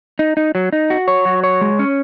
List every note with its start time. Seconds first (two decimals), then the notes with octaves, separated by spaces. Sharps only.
0.19 D#4
0.37 D#4
0.55 F#3
0.73 D#4
0.90 F#4
1.08 C#5
1.25 F#3
1.44 C#5
1.61 G#3
1.79 C#4